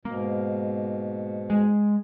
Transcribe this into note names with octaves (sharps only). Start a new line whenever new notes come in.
G#2 B2 A#3
G#3